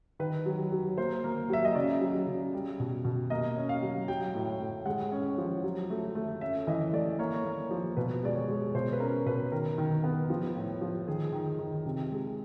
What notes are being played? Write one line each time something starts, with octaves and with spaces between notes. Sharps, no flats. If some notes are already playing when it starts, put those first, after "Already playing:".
D#3 B4
F#3
F#3
A#3 C5
A#3
F#3 E5
D#5
C#3 D5
F#3
C#3
G3
B2
B2
A#3 D#5
C#4
F5
F#3
F#3 G5
A2
A2
G#3 F#5
C#4
F3
F#3
A3
A3
C#4 E5
E3 D#5
A3 D5
A#3 C#5
A#3
F3
B2 B4
G#3 D5
C#5
G#3
B2 C5
B4
C#4 A#4
B2 B4
D#3 A#4
D#3
B3
F3
A2
F3
D#3 G#4
D#3
D#3
C3
G#3